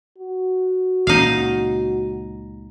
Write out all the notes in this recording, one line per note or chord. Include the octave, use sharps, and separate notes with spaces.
F#4
C#2 A#2 C#4 D#4 F5